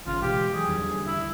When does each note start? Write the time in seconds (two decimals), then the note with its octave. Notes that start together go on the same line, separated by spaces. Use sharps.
0.06 G#1 C#3 F4
0.22 B2 E3 G#3 G4
0.54 E3 F#3 G#4
0.68 E2 D3 G3
1.07 E4